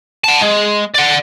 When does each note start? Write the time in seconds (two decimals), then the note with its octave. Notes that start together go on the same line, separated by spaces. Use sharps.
0.24 F#5 A5
0.41 G#3
0.94 D5 F#5